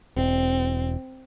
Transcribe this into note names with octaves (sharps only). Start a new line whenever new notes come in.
E1 C4